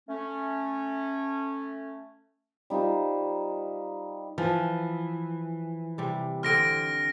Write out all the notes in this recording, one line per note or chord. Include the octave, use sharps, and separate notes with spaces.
A3 C#4
G3 D#4 F4 C5
E3 F3
C3 G3
D3 C4 F6 A#6 D7